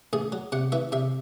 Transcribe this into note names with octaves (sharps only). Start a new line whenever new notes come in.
A1 G#4
F#3
C3 F#5
E3 E5
C3 E5